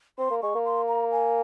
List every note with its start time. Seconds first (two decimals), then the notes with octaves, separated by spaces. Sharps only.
0.18 C4 C6
0.31 A#3
0.42 G#3 C#6
0.55 A#3
0.65 C6
0.88 A#5
1.11 G#5